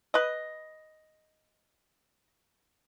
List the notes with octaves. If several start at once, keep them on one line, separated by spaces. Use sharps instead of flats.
B4 D#5